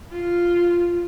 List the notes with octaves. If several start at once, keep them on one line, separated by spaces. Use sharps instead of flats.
F4